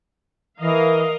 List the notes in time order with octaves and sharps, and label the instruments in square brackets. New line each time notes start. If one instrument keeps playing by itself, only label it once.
[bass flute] E3 [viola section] A#4 D#5 F5